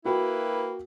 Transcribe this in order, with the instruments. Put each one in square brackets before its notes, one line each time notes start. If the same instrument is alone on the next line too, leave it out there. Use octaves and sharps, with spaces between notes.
[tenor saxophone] A#3 [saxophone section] E4 B4 [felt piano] F#4 G5